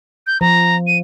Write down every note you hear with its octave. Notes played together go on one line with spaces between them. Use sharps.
G6
F3 A#5
D#7